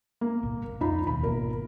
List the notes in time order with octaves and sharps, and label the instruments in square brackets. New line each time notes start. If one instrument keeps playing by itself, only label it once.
[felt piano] A#3
[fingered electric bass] G1 C2 A#2
[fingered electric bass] F2 [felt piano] D#4 F4 B5
[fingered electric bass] D#2 B2 [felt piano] B5
[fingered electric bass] G#1 B2 A#3 [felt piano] A#4